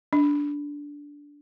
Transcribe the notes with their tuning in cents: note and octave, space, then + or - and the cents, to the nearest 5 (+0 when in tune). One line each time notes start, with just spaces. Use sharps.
D4 -15